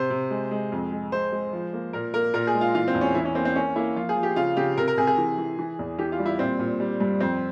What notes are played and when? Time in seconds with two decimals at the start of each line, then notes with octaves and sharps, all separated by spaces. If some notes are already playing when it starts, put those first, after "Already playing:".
Already playing: C3 C5
0.10 C3
0.31 G#3
0.51 G#3
0.72 F2
0.91 G#3
1.12 G#3 C5
1.32 G#3
1.53 F3
1.73 A#3
1.93 A#2 A#4
2.14 A#3 A#4
2.34 A#2 A#4
2.47 G#4
2.54 G#3
2.61 F4
2.75 E3 F4
2.88 C4
2.95 E2
3.01 C#4
3.15 E3 E4
3.25 C#4
3.35 A#3 C4
3.45 C4
3.56 A#3 C#4
3.76 A#3 E4
3.96 F3 F4
4.09 G#4
4.16 F3
4.23 G4
4.36 C#3 F4
4.57 C#3 G4
4.77 C3 A#4
4.88 A#4
4.97 C3 G#4
5.07 G#4
5.18 E3
5.38 E3
5.59 E3
5.79 E2
5.98 E3 G4
6.12 F4
6.19 G3
6.26 E4
6.39 A#2 C4
6.59 A#2
6.80 G3
7.00 G2
7.20 F2 C4